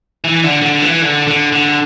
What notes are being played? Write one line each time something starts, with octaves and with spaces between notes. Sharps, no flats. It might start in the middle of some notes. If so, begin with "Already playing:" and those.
E3
D3
D3
E3
D3
D3
D3